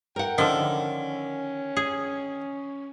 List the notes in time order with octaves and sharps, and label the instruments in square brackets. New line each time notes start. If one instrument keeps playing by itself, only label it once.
[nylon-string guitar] A#4 F#5 [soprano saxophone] G5
[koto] D3 F3 [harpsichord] D#3 [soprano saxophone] C#4
[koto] G#4